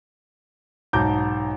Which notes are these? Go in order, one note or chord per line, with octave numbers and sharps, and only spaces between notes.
B1 G#2 A5 A#5 D6 G6